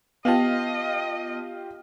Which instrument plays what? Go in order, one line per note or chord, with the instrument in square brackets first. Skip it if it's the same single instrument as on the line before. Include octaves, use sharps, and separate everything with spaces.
[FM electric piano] B3 A5 [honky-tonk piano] F4 G4 F5 [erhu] D#5